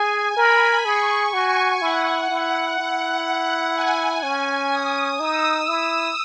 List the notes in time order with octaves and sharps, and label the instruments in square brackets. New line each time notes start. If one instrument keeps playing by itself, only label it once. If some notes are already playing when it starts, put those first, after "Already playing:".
Already playing: [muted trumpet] G#4 [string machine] G#5
[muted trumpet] A#4 [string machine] B5
[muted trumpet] G#4 [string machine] C#6
[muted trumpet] F#4 [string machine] G#5
[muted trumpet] E4 [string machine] F#5
[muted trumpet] E4
[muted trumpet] E4 [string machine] F#5
[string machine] G#5
[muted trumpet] C#4
[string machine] D#6
[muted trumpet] D#4 [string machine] E6
[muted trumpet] E4